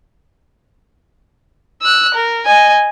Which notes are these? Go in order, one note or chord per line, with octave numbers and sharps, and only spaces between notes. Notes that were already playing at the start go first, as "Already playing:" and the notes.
E6 F#6
A#4
D#5 G#5